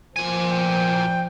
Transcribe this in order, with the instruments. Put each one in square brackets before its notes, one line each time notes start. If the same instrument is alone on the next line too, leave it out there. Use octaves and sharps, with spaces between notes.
[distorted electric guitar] A#2 G#5 [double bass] F3
[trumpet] G5